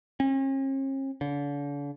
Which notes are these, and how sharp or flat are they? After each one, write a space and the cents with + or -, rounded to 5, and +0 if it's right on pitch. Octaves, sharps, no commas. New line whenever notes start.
C#4 -45
D3 -40